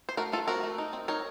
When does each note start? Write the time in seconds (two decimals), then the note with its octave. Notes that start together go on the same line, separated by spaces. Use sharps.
0.09 C5
0.17 A3 F#4 A#4
0.32 A3 F4 A4
0.48 C4 F#4 A#4
0.63 A3
0.78 D#4
0.93 C4
1.08 D#4 A#4 C#5